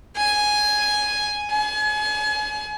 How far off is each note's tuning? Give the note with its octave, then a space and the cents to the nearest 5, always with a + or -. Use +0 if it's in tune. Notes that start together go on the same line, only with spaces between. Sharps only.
G#5 +5
G#5 +35